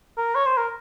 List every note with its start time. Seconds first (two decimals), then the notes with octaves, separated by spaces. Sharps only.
0.17 A#4
0.35 C#5
0.46 C5
0.57 A#4